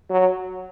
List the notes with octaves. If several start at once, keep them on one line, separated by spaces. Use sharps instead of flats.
F#3